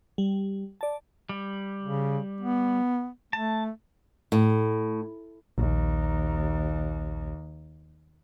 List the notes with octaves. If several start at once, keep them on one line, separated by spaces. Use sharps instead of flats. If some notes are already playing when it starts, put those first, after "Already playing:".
G3
D5 A5
G3
C#3
B3
A3 A5
A2
A#1 D#2